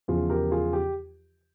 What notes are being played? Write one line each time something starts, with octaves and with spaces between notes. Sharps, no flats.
E2 C#3 F3 F4 G#4
G4 A#4
F4 G#4
G4